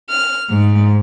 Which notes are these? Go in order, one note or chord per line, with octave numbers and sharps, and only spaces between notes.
F6
G#2